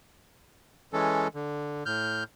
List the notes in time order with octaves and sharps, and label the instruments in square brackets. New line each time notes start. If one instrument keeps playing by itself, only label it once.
[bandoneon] E3 G#3 C#4 A4
D3
A2 F6 G6